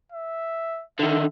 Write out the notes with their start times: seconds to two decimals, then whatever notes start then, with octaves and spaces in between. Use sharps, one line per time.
0.12 E5
1.00 D3 D#3 E5